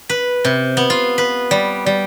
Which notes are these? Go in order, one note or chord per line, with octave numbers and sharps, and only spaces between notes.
B4
C3
B3
F4
B4
G3
G3